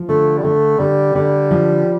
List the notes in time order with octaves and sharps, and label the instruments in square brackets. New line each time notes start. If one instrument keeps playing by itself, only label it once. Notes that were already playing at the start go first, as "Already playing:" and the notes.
Already playing: [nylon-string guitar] F3
[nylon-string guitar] D3 [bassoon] A3
[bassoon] G3
[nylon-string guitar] D3 [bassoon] A3
[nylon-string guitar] D3 [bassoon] G3
[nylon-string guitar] D3 [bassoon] G3
[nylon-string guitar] F3